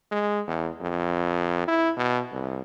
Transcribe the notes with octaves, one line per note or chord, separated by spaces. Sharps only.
G#3
E2
F2
E4
B2
C2